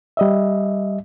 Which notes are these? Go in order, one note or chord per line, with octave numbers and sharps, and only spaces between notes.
G3 D#5 E5